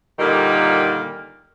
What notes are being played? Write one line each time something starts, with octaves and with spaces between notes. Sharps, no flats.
A#2 D3 D#3 G3 A#3